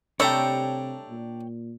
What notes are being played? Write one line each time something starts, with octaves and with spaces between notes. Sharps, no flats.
C3 G3 A3 D4 A4 C#5 G5 A#5
A#2